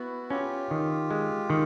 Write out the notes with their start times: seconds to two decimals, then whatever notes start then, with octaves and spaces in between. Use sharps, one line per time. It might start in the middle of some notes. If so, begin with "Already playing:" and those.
Already playing: B3 E4 F#4
0.30 C#4 F4 G4
0.71 D#3
1.11 G#3
1.50 D#3